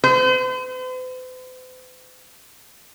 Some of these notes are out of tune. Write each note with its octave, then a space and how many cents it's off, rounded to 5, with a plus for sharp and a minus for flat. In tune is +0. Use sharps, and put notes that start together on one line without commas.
C5 -45